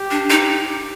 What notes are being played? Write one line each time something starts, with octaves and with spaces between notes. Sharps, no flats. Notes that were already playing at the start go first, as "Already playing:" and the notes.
Already playing: G4
D4
D#4